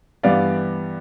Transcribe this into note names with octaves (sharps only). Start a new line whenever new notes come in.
G2 E3 G3 B3 D5 F5